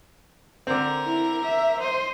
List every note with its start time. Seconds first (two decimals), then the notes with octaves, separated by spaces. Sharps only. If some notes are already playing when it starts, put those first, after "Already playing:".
0.67 D3 C4 A#4
1.05 E4
1.44 E5
1.81 C5 D#5